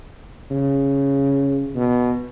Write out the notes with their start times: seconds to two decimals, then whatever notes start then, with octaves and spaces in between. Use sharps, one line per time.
0.51 C#3
1.75 B2